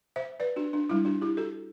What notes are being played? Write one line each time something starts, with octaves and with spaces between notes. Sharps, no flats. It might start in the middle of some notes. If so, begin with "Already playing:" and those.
C5 E5
B4 D5
D4 F#4
D4
G3 D4 E4
D4 F#4
E4 G4
F#4 A4